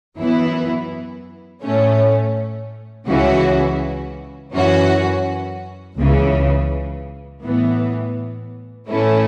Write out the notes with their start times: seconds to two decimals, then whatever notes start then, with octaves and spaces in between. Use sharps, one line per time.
0.16 F#2 E3 B3 E4
1.62 A2 A3 C#4
3.07 C#2 C#3 E3 C#4 F#4
4.52 F#2 E3 C#4 F#4
5.97 C#2 C#3 E3
7.43 A2 E3 B3
8.88 A2 E3 A3 C#4 E4